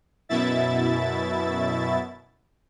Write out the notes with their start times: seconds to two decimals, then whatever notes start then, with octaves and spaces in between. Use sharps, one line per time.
0.29 F#2 B2 E4 E5 A6